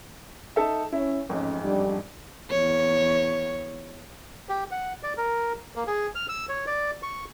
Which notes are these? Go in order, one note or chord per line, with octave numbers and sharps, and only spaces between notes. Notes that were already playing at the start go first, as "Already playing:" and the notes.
D#4 A4 E5
C#4 E4
A1 F2 G#2 C#4
G3 D4
E2 C#5
G4
F#5
D5
A#4
A#3
G#4
F6
E6
C#5
D5
C#6